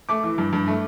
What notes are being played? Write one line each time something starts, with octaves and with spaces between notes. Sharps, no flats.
A3 D6
E3
G2
G2
A3